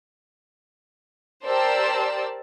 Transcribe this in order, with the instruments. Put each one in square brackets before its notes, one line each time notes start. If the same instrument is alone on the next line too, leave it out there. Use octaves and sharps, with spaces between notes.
[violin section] G4 A#4 C5 D5 A5 E6